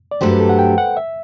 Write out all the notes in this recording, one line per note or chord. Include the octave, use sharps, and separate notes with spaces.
D5
G2 F#3 A3 D4 G4 C5
B4
A4
F#5
G5
F#5
E5